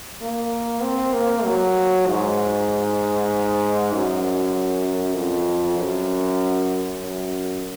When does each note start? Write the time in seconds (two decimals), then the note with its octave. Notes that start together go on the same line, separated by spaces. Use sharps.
0.22 A#3
0.83 C4
1.13 A#3
1.45 F#3
2.07 G#2
3.92 F#2
5.15 F2
5.78 F#2
7.02 F#2